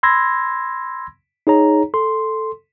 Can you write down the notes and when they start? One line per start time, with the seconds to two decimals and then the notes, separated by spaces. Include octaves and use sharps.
0.03 B5 C6 E6 G#6 A#6
1.47 D#4 G#4 C#5 A#5
1.94 A4 C6